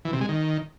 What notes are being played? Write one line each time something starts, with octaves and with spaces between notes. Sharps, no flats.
E3
C3
G#3
D#3